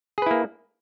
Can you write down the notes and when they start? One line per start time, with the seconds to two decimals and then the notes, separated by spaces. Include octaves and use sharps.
0.18 G#4
0.22 B4
0.26 E4
0.31 A#3